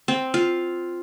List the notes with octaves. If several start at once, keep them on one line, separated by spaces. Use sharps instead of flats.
C4
F4